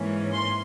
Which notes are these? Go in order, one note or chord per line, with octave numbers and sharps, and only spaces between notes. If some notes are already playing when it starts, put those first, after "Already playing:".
Already playing: G#2 E3 A#3 C#4
C6